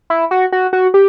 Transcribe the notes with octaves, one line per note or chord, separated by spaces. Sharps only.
E4
F#4
F#4
F#4
G4